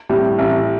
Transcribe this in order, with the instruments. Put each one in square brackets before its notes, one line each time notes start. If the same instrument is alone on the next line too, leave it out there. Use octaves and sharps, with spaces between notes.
[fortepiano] A2 G3
A1